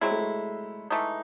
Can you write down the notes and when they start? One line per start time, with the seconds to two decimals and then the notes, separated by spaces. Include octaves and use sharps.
0.01 F#3 G#3 C4 E4
0.11 A3
0.18 G#3
0.90 E3 A3 D#4